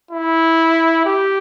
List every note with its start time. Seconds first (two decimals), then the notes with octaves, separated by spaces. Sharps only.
0.11 E4
1.05 G4